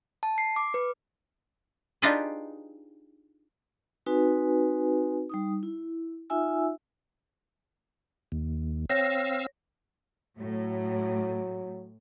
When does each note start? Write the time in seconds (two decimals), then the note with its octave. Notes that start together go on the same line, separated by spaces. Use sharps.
0.23 A5
0.38 C7
0.56 D6
0.74 B4
2.02 D4 D#4 F4 G4 G#4 B4
4.06 C4 D#4 F#4 B4 G#5
5.30 G3 D#4 D#6
5.63 E4
6.30 D#4 F4 E5 G#5 E6
8.32 D#2
8.90 C4 C#5 F5 E6 A#6
10.38 A2 F#3